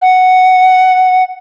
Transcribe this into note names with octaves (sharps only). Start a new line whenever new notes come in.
F#5